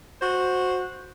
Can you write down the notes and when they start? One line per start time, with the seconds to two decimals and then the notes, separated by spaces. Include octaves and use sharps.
0.21 F#4 C5